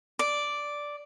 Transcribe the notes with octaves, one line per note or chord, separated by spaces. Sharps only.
D5